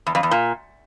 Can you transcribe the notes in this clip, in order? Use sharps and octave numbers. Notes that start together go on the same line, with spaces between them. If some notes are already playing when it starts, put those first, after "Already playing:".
E2
F2
E2
A#2